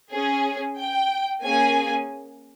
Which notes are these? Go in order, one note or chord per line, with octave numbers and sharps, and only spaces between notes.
C#4 G#4
G5
A#3 C#4 G#4 G#5